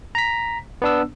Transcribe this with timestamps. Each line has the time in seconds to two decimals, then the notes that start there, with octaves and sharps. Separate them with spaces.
0.15 A#5 B6
0.82 B3 D4 E6